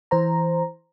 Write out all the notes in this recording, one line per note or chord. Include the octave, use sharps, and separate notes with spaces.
E3 C5 A#5